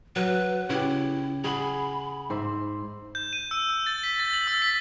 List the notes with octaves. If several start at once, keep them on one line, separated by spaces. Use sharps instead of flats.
F#3 B4
C#3 E4 G4
G#4 F#5 B5
G#2 C5 E5
G6
D#7
E6
E6
A6
B6
A6
F#7
E6
B6